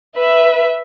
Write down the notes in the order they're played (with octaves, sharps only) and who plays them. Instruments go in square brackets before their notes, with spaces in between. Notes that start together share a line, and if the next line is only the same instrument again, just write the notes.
[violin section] B4 E5